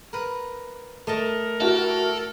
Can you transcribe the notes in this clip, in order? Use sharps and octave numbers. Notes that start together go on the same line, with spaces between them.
A#4 B4
A3 A#4 D#5 A5
E4 F#4 G4 A4